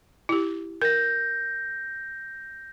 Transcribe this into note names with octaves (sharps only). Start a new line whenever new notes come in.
E4 G4
A#4 G6 A#6